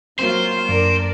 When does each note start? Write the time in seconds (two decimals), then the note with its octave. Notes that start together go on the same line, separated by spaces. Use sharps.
0.19 F#3 A#3 C4 F4 C5
0.69 F#2 D4 A#4 D5